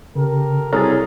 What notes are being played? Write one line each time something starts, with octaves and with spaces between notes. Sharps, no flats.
C#3 G4 A4 A#4
C2 F#3 G#4 A4 C#5 A#5 F6 A6